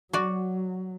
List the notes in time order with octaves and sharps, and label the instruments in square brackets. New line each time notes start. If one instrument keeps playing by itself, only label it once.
[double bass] F#3 [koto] F#4 D5